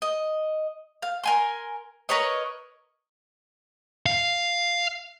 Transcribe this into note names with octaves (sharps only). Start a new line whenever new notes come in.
D#5
F5
A#4 G#5 C6
A#4 B4 C#5 D#5
F5